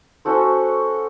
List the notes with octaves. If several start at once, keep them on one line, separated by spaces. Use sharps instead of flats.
C#4 F#4 A4 C5